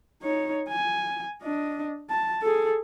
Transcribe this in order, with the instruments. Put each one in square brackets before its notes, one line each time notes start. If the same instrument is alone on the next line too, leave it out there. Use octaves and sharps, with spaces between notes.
[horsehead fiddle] D#4 C#5
G#5
D4 D#5
A5
G#4 A4